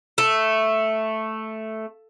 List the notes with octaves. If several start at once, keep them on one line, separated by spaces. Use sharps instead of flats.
A3